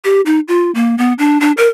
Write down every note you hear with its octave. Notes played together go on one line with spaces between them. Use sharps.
G4
D#4
F4
A#3
B3
D4
D4
A#4